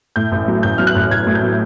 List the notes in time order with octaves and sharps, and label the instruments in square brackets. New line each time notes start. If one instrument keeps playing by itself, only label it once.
[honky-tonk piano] A2 G6
A1
F#3
A1 G6
F#3 F6
F#6
A1
A1 G#6
A2
G6
F#3